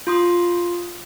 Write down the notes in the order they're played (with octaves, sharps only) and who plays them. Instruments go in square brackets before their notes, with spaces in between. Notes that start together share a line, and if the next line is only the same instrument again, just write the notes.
[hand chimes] F4 C6 D#6